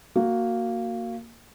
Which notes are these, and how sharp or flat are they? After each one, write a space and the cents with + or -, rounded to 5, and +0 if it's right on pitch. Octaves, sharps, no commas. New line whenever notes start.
A#3 -10 F#4 +0